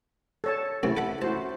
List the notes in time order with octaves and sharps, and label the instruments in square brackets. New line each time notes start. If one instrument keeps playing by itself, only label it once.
[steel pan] A4 C#5 A5
[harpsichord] A1 F#2 C3 [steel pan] C#4 E4
[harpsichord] A4 F#5 B5
[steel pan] E4 F#4 C5 [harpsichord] A5